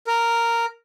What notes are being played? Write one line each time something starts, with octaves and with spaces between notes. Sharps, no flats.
A#4